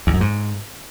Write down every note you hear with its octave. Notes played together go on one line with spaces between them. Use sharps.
E2
F#2
G#2